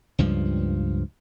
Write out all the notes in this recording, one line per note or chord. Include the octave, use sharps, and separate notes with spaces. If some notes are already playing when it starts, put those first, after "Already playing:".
C#2 G2 F3